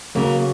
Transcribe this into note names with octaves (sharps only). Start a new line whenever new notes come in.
C#3 F#3 A#3